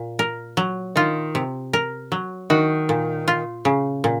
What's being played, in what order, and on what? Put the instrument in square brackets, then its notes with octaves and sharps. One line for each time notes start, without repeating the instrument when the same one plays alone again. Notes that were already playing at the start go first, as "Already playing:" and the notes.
Already playing: [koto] A#2
A#4
F#3
[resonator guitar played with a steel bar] D#3 [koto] F4
[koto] C3
A#4
F#3
[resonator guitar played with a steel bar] D#3 [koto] F#4
[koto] A#2
F4
C#3
A#2